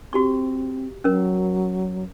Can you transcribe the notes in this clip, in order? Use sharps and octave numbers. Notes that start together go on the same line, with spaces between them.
C4 F#4 G4 C#6
F#3 C#4 A#4